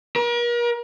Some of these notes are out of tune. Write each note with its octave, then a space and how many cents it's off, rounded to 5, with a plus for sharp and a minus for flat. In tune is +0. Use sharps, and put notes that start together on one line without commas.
A#4 +40